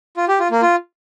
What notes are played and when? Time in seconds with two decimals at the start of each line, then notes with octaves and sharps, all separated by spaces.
0.17 F4
0.28 G4
0.39 F4
0.51 A#3
0.62 F4